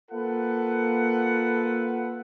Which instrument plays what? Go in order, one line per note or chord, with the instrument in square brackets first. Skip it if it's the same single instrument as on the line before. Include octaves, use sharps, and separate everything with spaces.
[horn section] A#3 F4 A4 B4 F#5